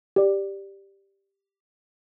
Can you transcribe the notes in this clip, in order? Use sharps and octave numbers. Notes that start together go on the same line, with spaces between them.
G4 D5